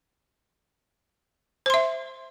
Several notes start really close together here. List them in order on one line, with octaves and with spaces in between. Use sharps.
C5 C6 E5